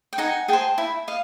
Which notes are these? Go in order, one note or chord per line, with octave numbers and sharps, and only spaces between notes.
G5
D#4 F#5 G#5
G#4 C5 G5 A5
E4
D#5 F5